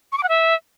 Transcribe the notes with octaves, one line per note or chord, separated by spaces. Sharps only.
C#6
D6
F#5
E5